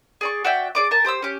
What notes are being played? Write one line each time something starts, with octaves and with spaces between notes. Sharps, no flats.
G#4 D5 C#6
F#4 D5 E5 G5
G#4 D5 D6
A#4 G#5 A5
G4 C5 D#6 E6
C#4 G4